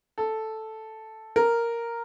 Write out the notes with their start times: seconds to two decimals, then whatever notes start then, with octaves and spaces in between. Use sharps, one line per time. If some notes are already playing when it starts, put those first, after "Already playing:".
0.18 A4
1.36 A#4